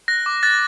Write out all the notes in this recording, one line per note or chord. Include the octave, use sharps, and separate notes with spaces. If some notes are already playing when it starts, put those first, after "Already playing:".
F#6 A#6
D6
F#6 A6